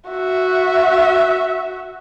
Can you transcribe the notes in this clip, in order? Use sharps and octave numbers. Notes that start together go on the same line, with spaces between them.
F#4 E5